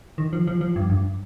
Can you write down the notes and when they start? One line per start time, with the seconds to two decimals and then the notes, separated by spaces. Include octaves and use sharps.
0.18 D#3
0.33 F3
0.47 F3
0.61 F3
0.76 G2
0.90 G2